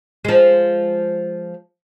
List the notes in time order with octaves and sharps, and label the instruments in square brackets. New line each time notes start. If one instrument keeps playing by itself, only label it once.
[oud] F3 G#3